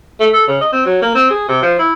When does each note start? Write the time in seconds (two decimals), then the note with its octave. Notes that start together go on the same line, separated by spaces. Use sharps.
0.20 A3
0.33 A4
0.47 C#3
0.61 D#5
0.72 C4
0.86 F#3
1.02 A#3
1.15 C4
1.30 G#4
1.48 C3
1.62 F3
1.79 E4